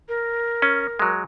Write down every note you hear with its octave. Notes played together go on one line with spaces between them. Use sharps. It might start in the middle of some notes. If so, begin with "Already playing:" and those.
A#4
C#4
F#3 G#3